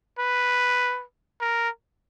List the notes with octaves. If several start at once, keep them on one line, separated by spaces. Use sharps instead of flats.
B4
A#4